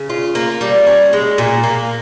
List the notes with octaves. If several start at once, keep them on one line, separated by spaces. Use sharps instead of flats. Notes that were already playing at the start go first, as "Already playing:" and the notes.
Already playing: C#3
F4
A#3
G3
C#4
G#3
A#2
A#3